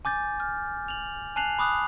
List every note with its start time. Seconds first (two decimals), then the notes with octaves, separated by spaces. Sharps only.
0.05 G#5 D6 G6 A6
0.40 F6
0.88 F7 F#7
1.36 G#5 A5 F#6 C7 F7 F#7
1.59 B5 D6 D#6 F#6